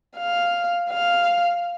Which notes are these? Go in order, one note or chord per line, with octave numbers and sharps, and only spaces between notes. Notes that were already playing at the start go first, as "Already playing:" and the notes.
F5
F5